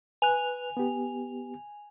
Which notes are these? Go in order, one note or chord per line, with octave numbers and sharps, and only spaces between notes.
B4 G#5 F#6 F7
B3 G4